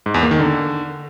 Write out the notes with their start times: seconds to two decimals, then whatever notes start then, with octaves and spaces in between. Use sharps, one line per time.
0.06 G#2
0.14 E2
0.23 A#3
0.31 D#3
0.40 D3